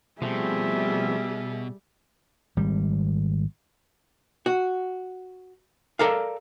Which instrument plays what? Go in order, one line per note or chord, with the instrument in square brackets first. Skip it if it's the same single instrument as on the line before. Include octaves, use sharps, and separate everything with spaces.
[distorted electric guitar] B2 [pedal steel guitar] F3 A3 C4 [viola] G3 [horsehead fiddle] G#4 E5
[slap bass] G#1 G3
[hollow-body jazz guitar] F#4
A4 A#4 D5 F5